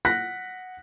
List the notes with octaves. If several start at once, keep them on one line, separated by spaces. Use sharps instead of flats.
F#5 F#6 A#6 B6